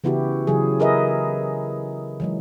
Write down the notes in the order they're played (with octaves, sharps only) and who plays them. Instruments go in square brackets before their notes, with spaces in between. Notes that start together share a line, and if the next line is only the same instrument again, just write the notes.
[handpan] C#3 E3 B3 E4 F#4 G4
C#3 E3 F#3 G#4
G#4 A#4 B4 D#5 E5
E3 F#3 G#3